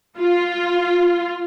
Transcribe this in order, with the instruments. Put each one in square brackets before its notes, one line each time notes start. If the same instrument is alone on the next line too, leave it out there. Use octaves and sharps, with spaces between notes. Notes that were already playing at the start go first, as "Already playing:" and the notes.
[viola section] F4